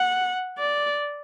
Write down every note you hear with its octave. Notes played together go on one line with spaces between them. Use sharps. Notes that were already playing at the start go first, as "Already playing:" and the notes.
Already playing: F#5
D5